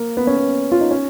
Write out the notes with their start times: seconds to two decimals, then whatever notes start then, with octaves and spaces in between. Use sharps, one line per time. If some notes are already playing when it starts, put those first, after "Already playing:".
Already playing: A#3
0.17 B3
0.27 C#4
0.37 B3
0.72 F4
0.81 D#4
0.91 C#4